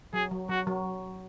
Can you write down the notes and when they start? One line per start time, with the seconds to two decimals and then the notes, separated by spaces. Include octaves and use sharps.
0.13 F#3 G#4
0.31 F#3
0.49 F#3 F#4
0.67 F#3